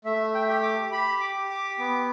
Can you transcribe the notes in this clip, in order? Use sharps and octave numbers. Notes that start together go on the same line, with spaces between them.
A3 E5
G5
E5
G4 G5
D6
G4 B5
D6
G4
D6
B3 D6